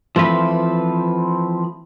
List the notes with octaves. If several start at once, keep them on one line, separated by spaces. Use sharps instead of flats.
E3 F3 A3 C4 B4